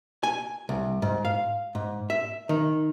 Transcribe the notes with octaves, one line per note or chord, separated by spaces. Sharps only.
G#5
C2
G#2
F5
G#2
E5
D#3